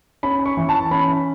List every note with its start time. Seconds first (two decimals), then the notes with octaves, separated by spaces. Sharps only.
0.23 C#4 B5
0.46 C#6
0.57 E3
0.69 A5
0.91 C#4 B5